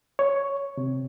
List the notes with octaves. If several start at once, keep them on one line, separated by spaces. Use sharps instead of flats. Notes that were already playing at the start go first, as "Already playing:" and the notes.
C#5
C3